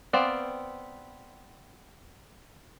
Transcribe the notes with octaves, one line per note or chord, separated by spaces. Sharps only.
B3 C4 D5 F5